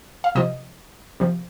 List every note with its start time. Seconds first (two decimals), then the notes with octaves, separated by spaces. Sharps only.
0.24 F5
0.35 C3 F3 D#5
1.20 C3 F3